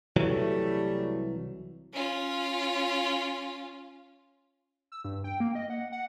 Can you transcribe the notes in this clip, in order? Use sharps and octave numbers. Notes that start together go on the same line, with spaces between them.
C2 E3 F#3 G3 A3
C#4 F4
E6
G2
G5
A#3
D#5
F#5
F#5